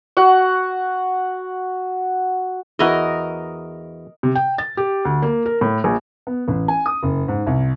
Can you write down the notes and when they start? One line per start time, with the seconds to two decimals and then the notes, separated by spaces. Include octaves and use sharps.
0.17 F#4 F#5
2.79 E2 E4 F#4 A#4 D#5
4.23 C3
4.35 G5
4.58 A6
4.77 G4
5.05 D2
5.22 A#3
5.46 A#4
5.61 A2
5.84 A#1
6.27 B3
6.48 A1
6.68 G#5
6.86 D#6
7.03 F#1
7.28 G#2
7.47 C2